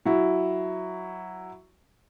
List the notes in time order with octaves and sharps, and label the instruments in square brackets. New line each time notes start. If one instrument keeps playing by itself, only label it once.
[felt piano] F#3 E4